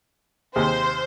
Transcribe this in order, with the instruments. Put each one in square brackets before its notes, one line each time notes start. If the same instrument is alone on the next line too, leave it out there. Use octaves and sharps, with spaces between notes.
[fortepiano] D#2 C3 G#4 [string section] C5